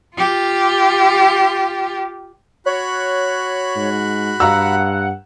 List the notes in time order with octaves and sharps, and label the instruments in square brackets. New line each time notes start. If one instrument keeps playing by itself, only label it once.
[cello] F4 G4
[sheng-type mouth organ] F#4 B5 F#6 [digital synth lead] C#5
[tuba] G#2
[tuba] G2 [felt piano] F5 A#5 E6 [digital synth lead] F#5